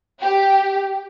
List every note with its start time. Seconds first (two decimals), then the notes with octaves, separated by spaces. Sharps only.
0.22 G4